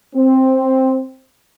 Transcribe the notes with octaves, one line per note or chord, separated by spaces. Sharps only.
C4